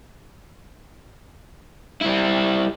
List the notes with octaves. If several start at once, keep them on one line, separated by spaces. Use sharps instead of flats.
G3 E4